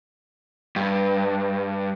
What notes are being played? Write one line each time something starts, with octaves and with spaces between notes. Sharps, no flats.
G2